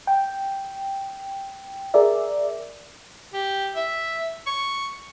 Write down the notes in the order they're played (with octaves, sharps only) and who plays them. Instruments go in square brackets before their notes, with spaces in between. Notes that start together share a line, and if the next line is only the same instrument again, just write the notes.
[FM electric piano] G5
G#4 A#4 D5 E5
[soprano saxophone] G4
E5
C#6